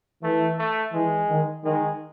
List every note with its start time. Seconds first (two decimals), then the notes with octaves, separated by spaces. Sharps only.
0.23 E3 A3
0.58 A3
0.93 E3 G#3
1.29 D#3
1.64 D#3 G#3